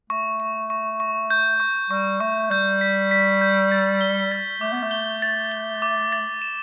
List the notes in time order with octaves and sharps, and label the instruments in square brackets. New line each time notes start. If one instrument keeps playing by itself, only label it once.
[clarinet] A3 [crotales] C#6
[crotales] C#6
C#6
C#6
G6
C#6
[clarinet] G3 [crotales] C#6
[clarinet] A3 [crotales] C#6
[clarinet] G3 [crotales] G6
[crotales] B6
B6
G6
A6
G7
A6
[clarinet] A3 [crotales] D6
[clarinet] B3
A3
[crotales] G7
A6
G7
D6
A6
E7